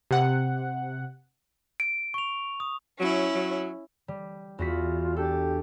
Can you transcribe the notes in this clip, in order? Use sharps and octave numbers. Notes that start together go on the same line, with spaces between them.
C3 F#5
D7
C#6 F7
D#6
F#3 C#4 E4
F#3
G3
E2 F4 F#4 B6
D4 G4 A4